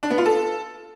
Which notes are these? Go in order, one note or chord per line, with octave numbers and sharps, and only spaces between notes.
D4
B3
F4
A4